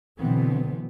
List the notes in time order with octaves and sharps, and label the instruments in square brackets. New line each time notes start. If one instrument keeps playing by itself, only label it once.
[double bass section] B2 D3 E3 F#3 B3 C4